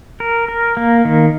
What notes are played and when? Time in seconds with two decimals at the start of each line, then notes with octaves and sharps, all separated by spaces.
0.20 A#4
0.48 A#4
0.77 A#3
1.05 D#3